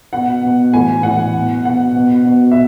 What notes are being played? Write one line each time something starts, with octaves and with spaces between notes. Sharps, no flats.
B2 F#5
B2
A2 E3 G#5
A2 E3 F#5
B2
B2 F#5
B2
B2
E5